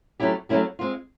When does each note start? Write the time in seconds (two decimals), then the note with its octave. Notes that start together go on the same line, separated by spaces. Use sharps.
0.20 F#3 A3 C#4 E4 G4
0.49 F#3 A3 C#4 E4 G4
0.79 G#3 C4 F4